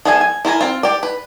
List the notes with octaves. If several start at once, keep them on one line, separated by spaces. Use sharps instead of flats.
F3 B3 G#4 E5 G#5
G#5
E4 F4 A#4 G#5
C4 F4
G4 D5
B4